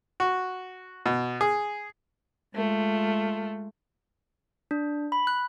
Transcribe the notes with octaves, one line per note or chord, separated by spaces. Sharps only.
F#4
B2
G#4
G#3 A3 F4
D4
B5
F#6